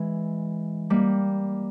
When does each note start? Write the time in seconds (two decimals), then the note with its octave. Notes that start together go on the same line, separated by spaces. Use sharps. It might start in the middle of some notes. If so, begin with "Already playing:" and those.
Already playing: E3 G#3
0.90 G3 A#3